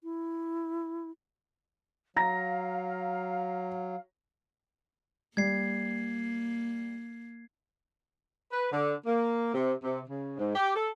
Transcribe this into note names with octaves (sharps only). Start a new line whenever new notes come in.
E4
F#3 F5 A#5 A#6
G3 A#3 G#6 C7
B4
D3
A#3
C3
C3
C#3
G#2
G4
A4